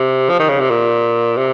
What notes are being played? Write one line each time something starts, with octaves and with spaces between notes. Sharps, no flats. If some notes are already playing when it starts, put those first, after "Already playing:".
Already playing: C3
F3
D#3
C#3
C3
A#2
C3